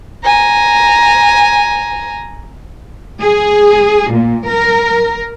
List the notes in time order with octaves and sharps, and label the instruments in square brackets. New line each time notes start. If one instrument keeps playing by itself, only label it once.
[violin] G#5 A#5
[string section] G#4
A#2
A#4